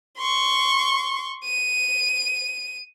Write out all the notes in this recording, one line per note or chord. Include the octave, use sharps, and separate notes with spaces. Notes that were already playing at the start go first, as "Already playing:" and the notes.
C6 C#6
D#7